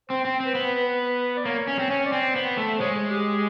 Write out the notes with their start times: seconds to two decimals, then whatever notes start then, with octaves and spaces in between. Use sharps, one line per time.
0.10 C4 C5
0.25 C4
0.40 C4
0.46 B4
0.55 B3 C5
0.67 B4
0.78 B4
1.00 B4
1.36 D5
1.45 A#3 C#5
1.67 C#4
1.79 C4
1.90 C#4 C#5
2.06 D5
2.12 C4
2.36 B3 C5
2.57 A3
2.80 G#3 C#5
2.95 G#4
3.10 G4